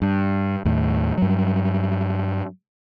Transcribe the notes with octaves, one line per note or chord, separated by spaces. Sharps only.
G2
D#2 A2
G2 F#3